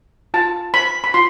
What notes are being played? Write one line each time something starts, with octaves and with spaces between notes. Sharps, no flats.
F4 A5
C5 B5
B5
F4 C6